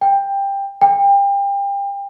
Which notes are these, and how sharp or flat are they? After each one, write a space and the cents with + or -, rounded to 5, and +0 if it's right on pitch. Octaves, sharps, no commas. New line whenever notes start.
G5 +15
G5 +30